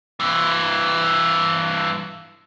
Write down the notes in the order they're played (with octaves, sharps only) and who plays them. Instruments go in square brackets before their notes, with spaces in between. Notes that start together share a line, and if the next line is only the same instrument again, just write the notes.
[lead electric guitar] G2 E3